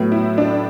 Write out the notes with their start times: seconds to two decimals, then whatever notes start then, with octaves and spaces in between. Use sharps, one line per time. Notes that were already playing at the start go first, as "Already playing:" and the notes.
Already playing: A2 F#3 B3
0.12 E4
0.38 D4